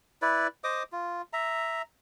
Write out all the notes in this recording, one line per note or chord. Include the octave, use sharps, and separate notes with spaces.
E4 B4 D5
C5 D#5 D6 D#6
F4
E5 A#5